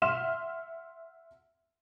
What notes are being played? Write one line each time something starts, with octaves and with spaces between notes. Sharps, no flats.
E5 F#5 C6 F6 E7